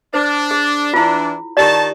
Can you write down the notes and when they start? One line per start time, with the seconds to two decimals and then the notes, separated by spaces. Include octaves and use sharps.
0.14 D4 C5
0.51 G#4
0.94 E3 D4 E4 F4
1.57 D#3 G4 C#5 D5 A5